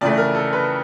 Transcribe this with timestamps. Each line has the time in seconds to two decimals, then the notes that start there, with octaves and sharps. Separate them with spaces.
0.01 F2 C#3 E3 A3 D5
0.17 A#4
0.35 A4
0.53 B4